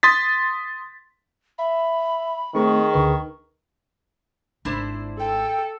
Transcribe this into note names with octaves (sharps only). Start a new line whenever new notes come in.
C6 D#6 A6 B6
E5 B5
D#3 A3 C4 G#4 C#6
D2 D3 B4
G#1 D4 E4 C5
A4 G5